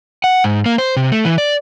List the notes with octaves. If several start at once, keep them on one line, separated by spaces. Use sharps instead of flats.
F#5
G#2
A#3
C5
C3
A3
E3
D5